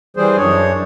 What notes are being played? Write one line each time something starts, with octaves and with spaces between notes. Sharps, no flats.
E3 G3 G#4 C5
F#2 D4 C#5